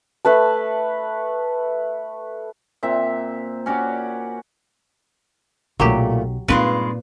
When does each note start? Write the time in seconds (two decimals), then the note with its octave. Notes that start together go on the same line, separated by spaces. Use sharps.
0.25 A3 B4 A5
2.83 A#2 C4 E5
3.66 C#4 F#4 G4 D5
5.80 B1 A#2 F#3 A3 A#3 G4
6.48 G2 A#2 G#3 C4 D#4 F4 B4